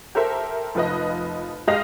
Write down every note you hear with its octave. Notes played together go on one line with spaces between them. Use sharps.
G4 A4 A#4 C5 E5
F1 F3 B4 D#5
G#3 G4 D#5 F5 A#6 F7